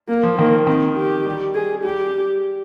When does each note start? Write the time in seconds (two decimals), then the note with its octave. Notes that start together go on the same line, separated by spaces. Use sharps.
0.09 A#3
0.23 F3
0.38 D#3 A#3
0.67 D#3 C4
0.96 G4
1.26 G3
1.55 G#4
1.84 G3 G4